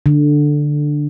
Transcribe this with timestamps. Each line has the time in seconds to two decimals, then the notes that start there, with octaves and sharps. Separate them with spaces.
0.06 D3